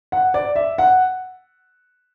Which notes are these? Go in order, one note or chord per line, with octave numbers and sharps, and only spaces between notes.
F#5
D5
E5
F#5